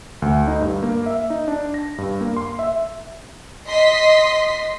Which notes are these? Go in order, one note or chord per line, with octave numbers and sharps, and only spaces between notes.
D2
D#4
G2
A#3
E5
D#4
D4
A#6
G2
A#3
C6
E5
D#5 C6 B6